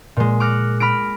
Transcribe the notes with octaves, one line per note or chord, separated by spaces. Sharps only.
A#2 G#3
D6 F6 F#6 A#6 C#7
B5 F6 A#6 D7